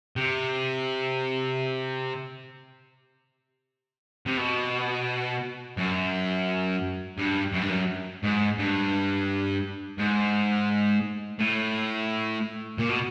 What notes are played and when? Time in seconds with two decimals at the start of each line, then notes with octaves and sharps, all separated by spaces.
0.16 C3
4.26 C3
4.37 B2
5.77 F#2
7.18 G2
7.53 F#2
7.61 G2
7.70 F#2
8.23 G#2
8.58 G2
9.98 G#2
11.39 A2
12.78 A#2
12.89 B2